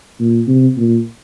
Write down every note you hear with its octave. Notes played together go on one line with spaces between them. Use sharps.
A#2
C3
A#2